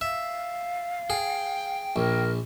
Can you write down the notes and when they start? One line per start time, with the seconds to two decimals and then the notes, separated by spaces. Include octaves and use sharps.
0.01 E5 F5
1.10 G#4 G5
1.96 A#1 A#4